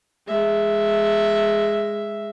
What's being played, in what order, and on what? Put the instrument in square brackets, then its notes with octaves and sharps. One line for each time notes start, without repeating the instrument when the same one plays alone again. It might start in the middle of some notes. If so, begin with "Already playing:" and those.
[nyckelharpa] G#3 E5